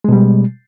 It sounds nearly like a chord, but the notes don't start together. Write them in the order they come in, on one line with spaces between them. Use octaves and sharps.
G#3 B2 G3